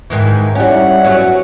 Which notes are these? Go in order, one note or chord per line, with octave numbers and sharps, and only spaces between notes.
G#2 D#3 E3
G3 C#4 E4 C#5 F#5
F#3 B3 C#4